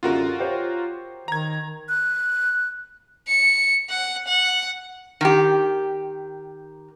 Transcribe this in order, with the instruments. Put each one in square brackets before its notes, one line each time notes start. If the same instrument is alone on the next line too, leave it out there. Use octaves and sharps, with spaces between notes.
[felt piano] C2 F#2 D3 [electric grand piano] F4 F#4 A#4
[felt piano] G4 C5 C#5
[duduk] D#3 [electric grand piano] A#5 G#6
[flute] F#6
[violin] C#7
F#5
F#5
[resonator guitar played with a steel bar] D#3 G4